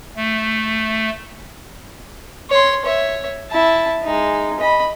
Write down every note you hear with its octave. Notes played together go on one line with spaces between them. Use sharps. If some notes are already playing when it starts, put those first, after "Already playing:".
A3
C#5 C6
C#5 E5
E4 A5
G#3 D#4
D#5 B5